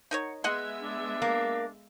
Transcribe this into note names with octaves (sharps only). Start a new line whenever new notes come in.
D#4 A#4 C#5 F#5
G#3 B3 D#5 E5 F#5 C6 F#6
D4
A#3